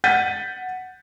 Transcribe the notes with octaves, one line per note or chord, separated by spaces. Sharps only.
F#5 G6 A6 B6 D#7